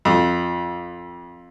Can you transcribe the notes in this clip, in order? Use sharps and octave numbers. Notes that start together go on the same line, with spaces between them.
F2